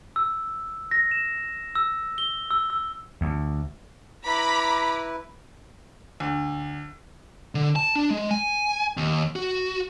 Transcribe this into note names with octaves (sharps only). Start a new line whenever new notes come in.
E6
A#6
E7
E6
G7
E6
E6
D2
E4 B4 A#5 B5 D6
D2
D3
A5
D4
G#3
G#5
D#2
F#4